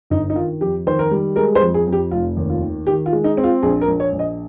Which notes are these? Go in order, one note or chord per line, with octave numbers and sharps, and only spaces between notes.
G1 D#4
D#4
D#3 F4
F2 G4
D#3 C5
A#4
G3
G#3 A#4
C5
F2
G#4
F2
G4
F1 F4
D#2
F4
D#3
D#3 G4
F4
G#3
D#4
C4
F4
A#1 G#4
A#4
A#1
C#5
A#1
D#5